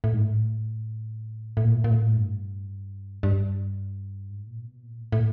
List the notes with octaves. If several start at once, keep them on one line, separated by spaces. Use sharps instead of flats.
A2
G#2
A2
A2
A#2
A#2
A2
G2
G2
G#2
A#2
B2
A#2
A2
A2